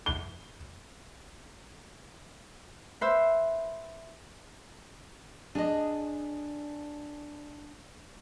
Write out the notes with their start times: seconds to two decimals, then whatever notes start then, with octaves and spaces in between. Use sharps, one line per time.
0.06 G7
3.01 B4 C5 E5
5.55 D4 G#4 D#5